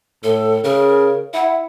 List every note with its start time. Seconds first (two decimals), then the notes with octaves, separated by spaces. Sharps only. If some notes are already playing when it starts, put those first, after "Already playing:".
0.24 A2 A4
0.64 C#3 A#4
1.34 E4 F#5